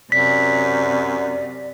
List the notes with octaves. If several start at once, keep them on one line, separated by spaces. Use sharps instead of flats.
F#2 C3 D5 B6